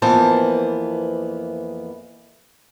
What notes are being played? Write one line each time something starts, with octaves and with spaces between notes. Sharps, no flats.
F2 E3 A#3 B3 C5 A5